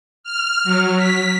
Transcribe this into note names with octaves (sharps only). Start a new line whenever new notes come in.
F6
F#3
B6